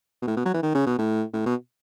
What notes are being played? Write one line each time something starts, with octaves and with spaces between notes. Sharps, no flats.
B2
A2
B2
F#3
E3
D#3
C#3
B2
A2
A2
B2